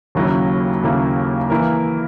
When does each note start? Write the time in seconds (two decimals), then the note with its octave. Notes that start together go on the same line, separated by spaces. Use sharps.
0.15 D#2 C#3 F#3 A#3 E4
0.83 D#2 C#3 F#3 A#3 E4
1.50 E3 A#3 E4 A#4